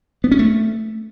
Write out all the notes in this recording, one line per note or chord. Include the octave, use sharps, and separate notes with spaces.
B3
C#4
A3